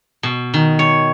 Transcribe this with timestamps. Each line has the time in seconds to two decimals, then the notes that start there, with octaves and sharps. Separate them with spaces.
0.23 B2
0.54 D#3
0.79 C#5